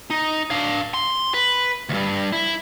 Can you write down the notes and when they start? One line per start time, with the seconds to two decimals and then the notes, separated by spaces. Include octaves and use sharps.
0.10 D#4
0.51 D4 F5
0.94 C6
1.34 B4
1.89 D2 G2
2.32 E4